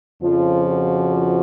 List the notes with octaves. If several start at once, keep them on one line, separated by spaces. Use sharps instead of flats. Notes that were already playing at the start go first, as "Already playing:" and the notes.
F2 C#3 F3 F4
F#4